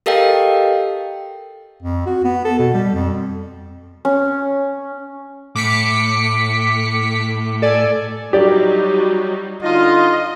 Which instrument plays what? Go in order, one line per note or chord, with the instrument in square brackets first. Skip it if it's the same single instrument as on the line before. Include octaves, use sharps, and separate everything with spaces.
[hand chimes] G4 A4 A#4 D#5 F5 G5
[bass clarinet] F2
F#4
B3
A4
B2
G3
F2
[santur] C#4
[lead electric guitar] A2 [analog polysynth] D6 B6 C#7
[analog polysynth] A4 D5 G#5
[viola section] F#3 G3 D#4 [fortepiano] G4 D5
[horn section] D3 D#4 F4 [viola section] D#5